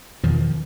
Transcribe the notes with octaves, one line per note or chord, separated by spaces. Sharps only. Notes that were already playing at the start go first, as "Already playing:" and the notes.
E2 B2 D#3 F3